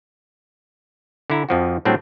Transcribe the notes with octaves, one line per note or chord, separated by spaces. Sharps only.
D3 E4 A#5
F2 F3 F#4
A2 F#3 G3 C4 D4